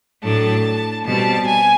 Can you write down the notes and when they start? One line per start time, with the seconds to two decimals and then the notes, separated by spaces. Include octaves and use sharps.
0.23 A2 F#3 A3 D4 A5
1.05 B2 G3 C4 A5
1.46 G#5